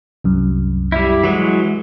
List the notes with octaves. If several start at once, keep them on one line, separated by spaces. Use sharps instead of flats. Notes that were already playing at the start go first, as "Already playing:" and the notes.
C2 F#2
G3 E4
E3 F#3 G#3 F#4